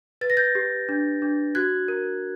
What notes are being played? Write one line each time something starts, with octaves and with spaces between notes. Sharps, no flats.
B4 A6
A#6
G6 A6
G4
D4
D4
F#4 F#6 G#6
A#4